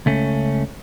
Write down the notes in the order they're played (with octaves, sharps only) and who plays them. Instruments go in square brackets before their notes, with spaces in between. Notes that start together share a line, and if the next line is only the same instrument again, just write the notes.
[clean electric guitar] C#2 A3 C#4